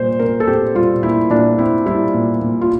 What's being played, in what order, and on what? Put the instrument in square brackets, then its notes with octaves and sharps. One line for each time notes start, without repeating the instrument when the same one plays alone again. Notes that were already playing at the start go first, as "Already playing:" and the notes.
Already playing: [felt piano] A#2 G3 C5
A#2 A#4
A4
C4 G4
G3 F4
A#2 E4
A#2 D4
C4 E4
G3 E4
A#2
A#2
F4